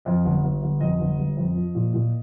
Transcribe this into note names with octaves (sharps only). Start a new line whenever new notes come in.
F2 D#5
G1
G1
G1
F2 D#5
G1
G1
F2
F3
A#2
A#2